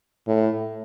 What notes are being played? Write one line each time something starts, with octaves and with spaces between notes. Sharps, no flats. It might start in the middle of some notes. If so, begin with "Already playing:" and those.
A2